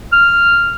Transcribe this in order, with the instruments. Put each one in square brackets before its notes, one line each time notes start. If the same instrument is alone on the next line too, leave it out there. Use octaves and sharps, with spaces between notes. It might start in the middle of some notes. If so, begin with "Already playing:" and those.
[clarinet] F6